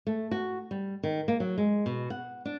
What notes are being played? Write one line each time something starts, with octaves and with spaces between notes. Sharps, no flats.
A3
F#4
G3
D#3
A#3
F#3
G#3
B2
F#5
D4